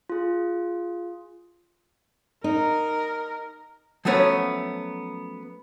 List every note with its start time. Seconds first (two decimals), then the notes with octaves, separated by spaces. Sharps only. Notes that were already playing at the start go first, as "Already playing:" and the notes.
0.10 F4 G#4
2.44 D#4 A#4
4.05 F3 F#3 A3 B3 C#4 C#5